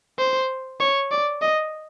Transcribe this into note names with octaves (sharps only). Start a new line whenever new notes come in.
C5
C#5
D5
D#5